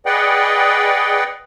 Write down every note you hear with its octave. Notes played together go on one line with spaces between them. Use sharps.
G#4 B4 D5 D#5 F#5 G5